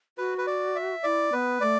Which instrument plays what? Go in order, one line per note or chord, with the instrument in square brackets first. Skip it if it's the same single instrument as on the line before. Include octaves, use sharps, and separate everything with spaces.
[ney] F#4 [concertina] B4
[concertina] B4
D5
E5
[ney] E4 [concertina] D5
[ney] B3 [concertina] B4
[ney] A3 [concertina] D5